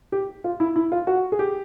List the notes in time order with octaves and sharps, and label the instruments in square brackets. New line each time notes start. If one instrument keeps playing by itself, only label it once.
[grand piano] G4
F4
E4
E4
F4
F#4
G#4
G4